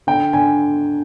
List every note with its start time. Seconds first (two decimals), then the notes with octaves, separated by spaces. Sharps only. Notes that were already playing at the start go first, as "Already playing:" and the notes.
0.07 D3 G5
0.33 D3 G#5